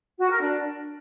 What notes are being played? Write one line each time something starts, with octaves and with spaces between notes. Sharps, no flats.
F#4
A#4
D4